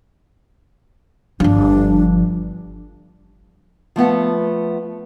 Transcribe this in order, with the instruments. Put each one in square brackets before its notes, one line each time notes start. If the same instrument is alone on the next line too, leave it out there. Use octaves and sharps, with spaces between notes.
[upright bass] G1 F3 [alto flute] D4
[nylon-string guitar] F3 A3 B3 F#5